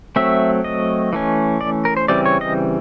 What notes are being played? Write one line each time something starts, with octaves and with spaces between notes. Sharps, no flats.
F#3 A3 C4 E5
D#5
E3 A3 C#4
D5
A#4
C5
C#3 E3 G3 C4 D5
C#5
D#5